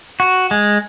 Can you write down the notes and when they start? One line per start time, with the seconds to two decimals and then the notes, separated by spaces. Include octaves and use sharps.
0.20 F#4
0.51 G#3